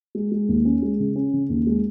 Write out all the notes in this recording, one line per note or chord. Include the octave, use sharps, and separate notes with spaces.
G#3
G#3
D#2
C#4
G#3
C#3
C#4
C#3
D#2
G#3